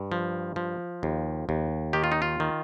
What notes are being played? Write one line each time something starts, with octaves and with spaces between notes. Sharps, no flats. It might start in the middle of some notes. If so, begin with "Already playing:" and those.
Already playing: G2
F3
F3
D#2
D#2
D#3 G4
F4
D#4
F4
D#3